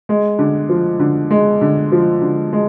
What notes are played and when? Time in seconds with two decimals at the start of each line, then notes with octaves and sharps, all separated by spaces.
0.09 G#3
0.39 D3
0.69 F3
0.99 D3
1.31 G#3
1.61 D3
1.92 F3
2.22 D3
2.53 G#3